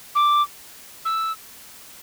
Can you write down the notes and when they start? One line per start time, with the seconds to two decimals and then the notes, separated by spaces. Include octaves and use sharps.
0.15 D6
1.05 E6